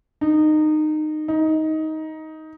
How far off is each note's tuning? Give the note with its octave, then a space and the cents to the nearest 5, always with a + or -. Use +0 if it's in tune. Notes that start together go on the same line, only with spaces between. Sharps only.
D#4 -20
D#4 +15